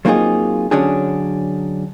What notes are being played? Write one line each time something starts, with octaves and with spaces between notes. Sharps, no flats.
F#3 A#3 C4 D#4 F4 G#4
D3 F#3 C#4 D4 G#4